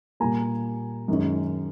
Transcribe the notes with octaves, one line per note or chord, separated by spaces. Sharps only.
A#2 G3 A#3 G#5 A#5
F#2 D#3 G#3 C#4